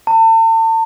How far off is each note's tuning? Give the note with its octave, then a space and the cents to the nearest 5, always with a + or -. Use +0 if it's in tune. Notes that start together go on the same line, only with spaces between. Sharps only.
A5 +40